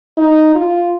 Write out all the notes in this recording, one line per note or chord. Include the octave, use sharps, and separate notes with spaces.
D#4
F4